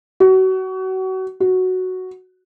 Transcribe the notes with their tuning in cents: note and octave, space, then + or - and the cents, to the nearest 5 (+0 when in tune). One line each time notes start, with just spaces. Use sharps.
F#4 +30
F#4 +0